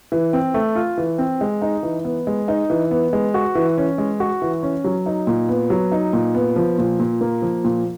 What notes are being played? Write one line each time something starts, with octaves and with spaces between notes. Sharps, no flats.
E3
C4
A3
F4
E3
C4
G#3
D#4
E3
B3
G#3
D#4
E3
B3
G#3
F#4
E3
C#4
G#3
F#4
E3
C#4
F#3
D#4
A#2
B3
F#3
D#4
A#2
B3
F3
A#2
A#2
A#3
F3
A#2